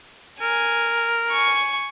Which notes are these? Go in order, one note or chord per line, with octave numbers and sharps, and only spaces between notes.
A#4 G#5
G#5 C#6